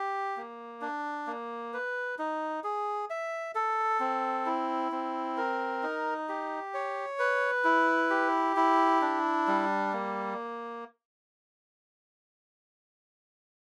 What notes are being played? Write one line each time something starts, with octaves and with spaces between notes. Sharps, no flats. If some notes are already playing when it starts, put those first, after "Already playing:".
Already playing: G4
A#3
D4
A#3
B4
D#4
G#4
E5
A4
C4
E4
C4
A#4
D#4
G4
C#5
B4
E4
G4
E4
D4
G3
A#3